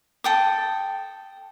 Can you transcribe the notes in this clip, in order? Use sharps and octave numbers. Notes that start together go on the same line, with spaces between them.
A4 G5 D#6